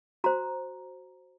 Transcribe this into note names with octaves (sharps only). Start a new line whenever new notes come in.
F#4 C5 A#5